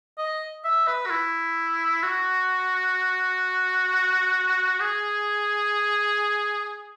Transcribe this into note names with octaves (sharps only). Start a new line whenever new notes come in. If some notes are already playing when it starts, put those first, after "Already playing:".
D#5
E5
B4
F#4
E4
F#4
G#4